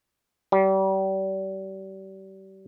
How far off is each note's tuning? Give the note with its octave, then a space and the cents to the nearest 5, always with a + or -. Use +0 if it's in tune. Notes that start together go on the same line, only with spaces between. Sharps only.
G3 -35